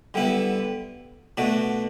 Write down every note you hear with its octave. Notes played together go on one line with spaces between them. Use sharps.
D3 G3 B3 E4
B2 A3 D4 F#4